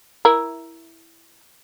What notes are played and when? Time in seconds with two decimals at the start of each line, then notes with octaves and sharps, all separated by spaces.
0.25 E4 A#4